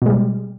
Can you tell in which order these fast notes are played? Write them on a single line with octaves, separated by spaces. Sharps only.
B2 G#3 G3